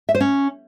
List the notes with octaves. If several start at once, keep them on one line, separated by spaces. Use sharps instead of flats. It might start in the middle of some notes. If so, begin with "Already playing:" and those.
E5
C5
C#4